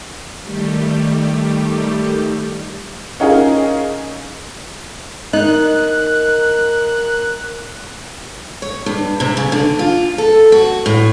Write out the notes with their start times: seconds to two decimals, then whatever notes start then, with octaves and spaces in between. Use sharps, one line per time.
0.42 D#3 G3 A3 G4
3.20 C#4 D#4 F4 G#4 A#4
5.33 D#4 A#4 D#5 F#6
8.62 C#5
8.86 G2
9.20 C3
9.37 C#3
9.52 D3
9.79 F4
10.18 A4
10.52 F#4
10.86 A2